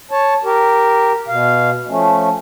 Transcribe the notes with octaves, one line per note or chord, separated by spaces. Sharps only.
C#5 A5
G4 A#4
B2 F5
F3 A3 C#4